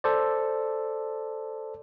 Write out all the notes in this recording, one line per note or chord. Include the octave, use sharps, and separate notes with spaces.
A4 C5 D5